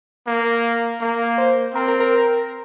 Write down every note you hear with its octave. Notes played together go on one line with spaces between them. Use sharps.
A#3
A#3
C5
C4 A#4
A#4
A#4